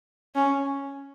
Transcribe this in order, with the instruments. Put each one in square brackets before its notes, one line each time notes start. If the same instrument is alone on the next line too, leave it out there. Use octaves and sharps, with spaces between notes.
[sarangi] C#4